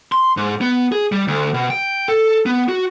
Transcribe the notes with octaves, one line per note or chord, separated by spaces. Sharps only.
C6
G#2
B3
G#4
G3
D2
B2
G5
A4
B3
F#4